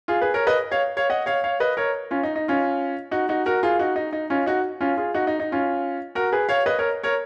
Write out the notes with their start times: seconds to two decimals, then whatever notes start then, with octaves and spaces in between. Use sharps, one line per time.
0.08 F4 G#4
0.21 G#4 B4
0.34 A#4 C#5
0.47 B4 D#5
0.71 C#5 F5
0.97 C#5 F5
1.10 D#5 F#5
1.26 C#5 F5
1.44 C#5 F5
1.60 B4 D#5
1.77 A#4 C#5
2.11 C#4 F4
2.23 D#4
2.36 D#4
2.48 C#4 F4
3.11 D#4 F#4
3.29 D#4 F#4
3.46 F#4 A#4
3.63 F4 G#4
3.79 D#4 F#4
3.96 D#4
4.13 D#4
4.30 C#4 F4
4.46 D#4 F#4
4.81 C#4 F4
4.97 F4 G#4
5.14 D#4 F#4
5.27 D#4
5.40 D#4
5.52 C#4 F4
6.15 F#4 A#4
6.32 G#4 B4
6.49 C#5 F5
6.66 B4 D#5
6.79 A#4 C#5
7.04 A#4 C#5